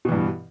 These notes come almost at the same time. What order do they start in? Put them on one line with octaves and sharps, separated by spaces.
B2 E3 G2